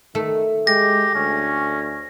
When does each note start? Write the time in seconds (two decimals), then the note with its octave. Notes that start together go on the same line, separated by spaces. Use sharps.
0.15 D#3 A3
0.67 G#3 G4 A#6
1.15 D2 C#4